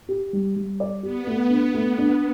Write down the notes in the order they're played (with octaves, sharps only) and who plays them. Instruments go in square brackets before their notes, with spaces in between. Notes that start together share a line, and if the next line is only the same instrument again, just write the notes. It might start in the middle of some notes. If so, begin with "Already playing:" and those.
[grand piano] G4
G3
G3
D5
[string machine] B3 [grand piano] G4
[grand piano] A3
D4
A3
D4